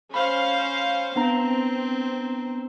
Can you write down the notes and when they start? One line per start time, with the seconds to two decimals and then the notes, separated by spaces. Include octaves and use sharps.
0.14 C#4 C5 F5 B5
1.16 B3 C4 D4 A#5